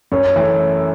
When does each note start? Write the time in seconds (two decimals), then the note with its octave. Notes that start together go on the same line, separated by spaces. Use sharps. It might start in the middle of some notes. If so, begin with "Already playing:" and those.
0.12 F#2 C#5
0.36 E3 A3